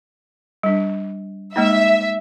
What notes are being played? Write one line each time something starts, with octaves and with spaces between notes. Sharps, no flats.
G3 D4
G#3 A#3 D#4 E5